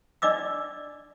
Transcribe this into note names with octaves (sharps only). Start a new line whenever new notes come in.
D4 D5 D#5 D6 E6